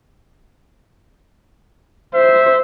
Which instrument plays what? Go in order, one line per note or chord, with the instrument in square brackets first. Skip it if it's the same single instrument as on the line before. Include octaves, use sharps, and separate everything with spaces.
[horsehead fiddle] C5 [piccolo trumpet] E5